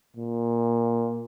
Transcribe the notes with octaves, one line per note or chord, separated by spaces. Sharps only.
A#2